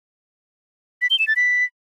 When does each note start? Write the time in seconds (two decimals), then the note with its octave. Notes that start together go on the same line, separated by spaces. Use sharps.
1.02 B6
1.10 G7
1.19 E7
1.28 A6
1.36 B6